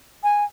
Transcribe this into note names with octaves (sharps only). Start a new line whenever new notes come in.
G#5